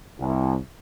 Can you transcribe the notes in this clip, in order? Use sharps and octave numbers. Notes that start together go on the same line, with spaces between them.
C2